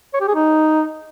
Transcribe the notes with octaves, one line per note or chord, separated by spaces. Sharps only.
C#5
G4
G#4
D#4